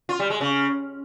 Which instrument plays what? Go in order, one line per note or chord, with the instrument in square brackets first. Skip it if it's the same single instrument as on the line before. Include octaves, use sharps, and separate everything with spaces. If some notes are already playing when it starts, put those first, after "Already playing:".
[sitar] F4
G3
G#3
C#3